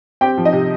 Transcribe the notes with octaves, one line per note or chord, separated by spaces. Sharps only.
C4 G4 G5
F3
D#4 D#5
C3